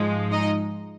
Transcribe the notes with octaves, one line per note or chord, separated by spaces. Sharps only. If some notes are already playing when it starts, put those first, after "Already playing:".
Already playing: G#2 F3 G#3
D#4 D#5